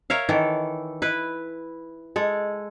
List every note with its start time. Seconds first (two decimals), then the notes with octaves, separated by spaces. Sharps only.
0.10 A#4 C#5 E5 F5
0.29 D#3 E3 A4
1.02 E4 B4
2.16 G#3 A4